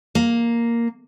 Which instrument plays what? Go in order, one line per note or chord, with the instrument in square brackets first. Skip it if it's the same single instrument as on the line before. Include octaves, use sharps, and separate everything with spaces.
[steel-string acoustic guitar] A#3